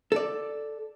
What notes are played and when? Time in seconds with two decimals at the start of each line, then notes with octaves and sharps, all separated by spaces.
0.12 A4 D5